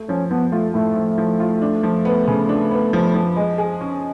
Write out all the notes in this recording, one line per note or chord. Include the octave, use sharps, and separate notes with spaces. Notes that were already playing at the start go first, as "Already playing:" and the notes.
Already playing: A3
F3 C#4
F3 B3
A3 F4
A2 A3
F3
F3
F4
D4
F3
B3
C#3
D4
B3
F3
F3
G#3
G#4
C#4